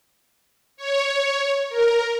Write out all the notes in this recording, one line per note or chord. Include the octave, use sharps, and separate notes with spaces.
C#5
A#4